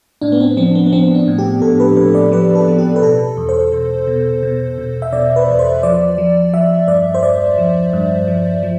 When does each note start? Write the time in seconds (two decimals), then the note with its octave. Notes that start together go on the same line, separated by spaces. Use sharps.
0.22 A2 D4
0.32 B3
0.40 C4
0.57 F3 C4
0.75 B3
0.86 B3
0.93 F3 C4
1.15 D4
1.28 A2
1.39 G4
1.62 A2 A4
1.80 B4
1.97 A2 B4
2.15 D5
2.32 F3 B4
2.55 A4
2.68 F3
2.79 G4
2.96 B4
3.02 B2 A4
3.37 E2
3.49 C5
3.72 B2
4.07 B2
4.43 B2
4.78 B2
5.02 E5
5.12 B2 D5
5.36 B4
5.48 E2
5.59 C5
5.83 F3 D5
6.18 F3
6.54 F3 E5
6.87 G2 D5
7.14 C5
7.23 G2 D5
7.58 F3
7.93 G2
8.28 F3
8.63 F3